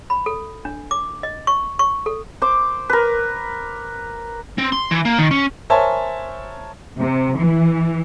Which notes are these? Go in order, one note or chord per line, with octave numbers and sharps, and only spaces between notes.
B5
A4
D4
D6
D#5
C#6
C#6
A4
C5 D6
A#4 B4
C4
C6
E3
A#3
D#3
C#4
A#4 C5 C#5 E5 G#5 A5
C3
E3